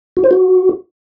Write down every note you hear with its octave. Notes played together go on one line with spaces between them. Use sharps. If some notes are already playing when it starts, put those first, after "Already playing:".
F#4
C5
F#4